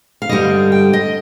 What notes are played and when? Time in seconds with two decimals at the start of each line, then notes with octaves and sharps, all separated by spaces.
0.22 F5
0.29 G2 D3 G3 D#5
0.72 G5
0.93 D#5